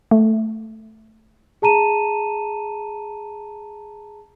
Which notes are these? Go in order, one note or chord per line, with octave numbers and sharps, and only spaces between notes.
A3
G#4 A5 A#5 D#7 E7